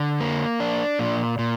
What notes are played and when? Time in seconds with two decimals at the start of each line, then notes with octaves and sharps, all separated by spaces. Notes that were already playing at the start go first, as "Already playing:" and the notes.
Already playing: D3
0.20 A#3
0.60 D4
0.99 A#2
1.39 A#2